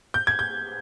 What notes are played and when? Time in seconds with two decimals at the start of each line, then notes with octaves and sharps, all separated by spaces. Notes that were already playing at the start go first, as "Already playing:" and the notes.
0.14 G6
0.27 G#6
0.39 G6